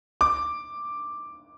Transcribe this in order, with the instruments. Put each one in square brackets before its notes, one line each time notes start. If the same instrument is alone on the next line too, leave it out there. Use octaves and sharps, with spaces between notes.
[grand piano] D6